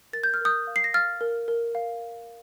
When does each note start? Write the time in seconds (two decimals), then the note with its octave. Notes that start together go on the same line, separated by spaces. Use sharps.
0.13 A#4 A6
0.23 G6
0.34 F6
0.41 A#4 D#6 G6
0.67 F5
0.76 C7
0.84 A#6
0.94 F5 F6 A6
1.21 A#4
1.48 A#4
1.75 F5